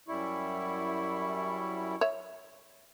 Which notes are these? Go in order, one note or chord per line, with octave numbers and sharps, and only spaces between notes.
F#2 G3 E4 C#6
C#5 E5